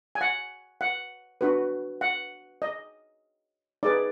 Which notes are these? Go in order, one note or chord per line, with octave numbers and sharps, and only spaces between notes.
G#5
F#5
F#5
D4 F#4 B4
F#5
D#5
D#4 G#4 B4 D5